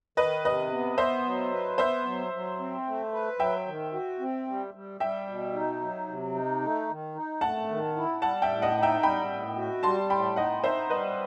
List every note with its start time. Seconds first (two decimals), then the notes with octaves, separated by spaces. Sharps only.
0.17 D#3 B4 D#5
0.44 C3 B4 D#5
0.71 B3
0.98 B3 C5 E5
1.25 F#3
1.52 B4
1.78 B3 C5 E5
2.05 F#3
2.33 F#3
2.59 C4
2.86 A3
3.12 B4
3.39 F#3 E5 G5
3.67 D#3
3.93 F#4
4.19 C4
4.47 G3
4.74 G3
5.00 G3 E5 G5
5.27 B2
5.54 D#4
5.81 F#3
6.07 C3
6.34 D#4
6.61 A3
6.89 D#3
7.15 D#4
7.41 A3 F#5 A5
7.68 D#3
7.96 E4
8.22 G3 F#5 A5
8.42 E5 G5
8.49 A2
8.62 D#5 F#5
8.75 D#4
8.83 E5 G5
9.03 G3 G5 B5
9.29 A2
9.56 F#4
9.83 G3 A5 C6
10.10 A2 G5 B5
10.36 D#4 D#5 F#5
10.63 D#4 C5 E5
10.90 G3 B4 D#5